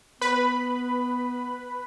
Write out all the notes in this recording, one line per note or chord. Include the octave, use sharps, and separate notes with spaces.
B3 B4 B5